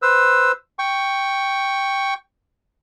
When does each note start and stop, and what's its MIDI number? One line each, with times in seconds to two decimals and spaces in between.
0.02 0.52 71
0.02 0.52 72
0.02 0.52 88
0.79 2.14 79
0.79 2.14 85